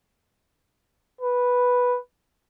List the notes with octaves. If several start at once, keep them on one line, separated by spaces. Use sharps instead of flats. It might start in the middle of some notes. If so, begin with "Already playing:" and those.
B4